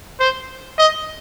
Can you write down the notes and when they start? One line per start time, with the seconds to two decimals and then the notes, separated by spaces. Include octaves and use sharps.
0.20 C5
0.78 D#5